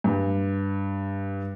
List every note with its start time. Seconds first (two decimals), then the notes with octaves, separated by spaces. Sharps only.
0.04 G2